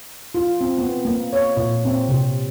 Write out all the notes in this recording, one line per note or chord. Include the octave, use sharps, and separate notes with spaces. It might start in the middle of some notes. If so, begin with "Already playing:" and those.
F4
C4
B3
A#3
C#5
A#2
C4
C3